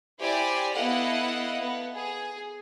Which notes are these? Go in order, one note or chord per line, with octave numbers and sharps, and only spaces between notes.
E4 G4 C5 D5 G#5
B3 E4 A4 D#5 F5 F#5
B3
G#4